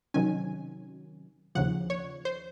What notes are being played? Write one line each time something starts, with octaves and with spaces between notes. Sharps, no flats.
C3 D#3 F#3 C#4 G#5
D#2 C#3 F3 F#5
C#5
C5